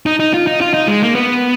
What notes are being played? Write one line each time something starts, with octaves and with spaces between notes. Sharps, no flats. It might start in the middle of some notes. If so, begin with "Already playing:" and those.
D#4
D#4
F4
D#4
F4
D#4
G#3
A#3
B3